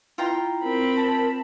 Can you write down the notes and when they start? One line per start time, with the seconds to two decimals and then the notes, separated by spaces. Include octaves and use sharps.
0.18 E4 F4 G5 A#5
0.64 C4 A#4 B5
0.97 A5